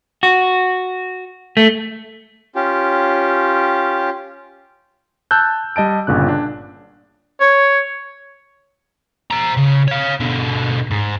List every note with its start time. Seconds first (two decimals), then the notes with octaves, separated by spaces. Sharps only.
0.23 F#4
1.57 A3
2.55 C#4 F4 G4
5.31 A5 E6 F#6 G6
5.76 G3 D#5 A5 D7
6.07 G1 A#2 C#3 F#6
6.29 D4
7.41 C#5
9.31 C5 A#5
9.57 C#3
9.88 C#5 F5
10.20 B2 D3
10.91 G#2